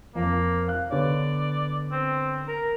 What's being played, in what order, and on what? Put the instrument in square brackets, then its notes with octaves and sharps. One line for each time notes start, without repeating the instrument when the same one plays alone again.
[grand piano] F2 [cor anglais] A#3
[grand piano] F5 F#6
[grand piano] D3 B3 C#5 [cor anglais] D5
[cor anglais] C4
A#4